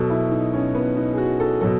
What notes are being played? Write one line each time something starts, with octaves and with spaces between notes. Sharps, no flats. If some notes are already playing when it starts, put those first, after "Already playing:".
Already playing: B2 F#3 A4
E4
D#4
C#4
B3
D#4
G#4
F#4
A4
B2 F#3 A4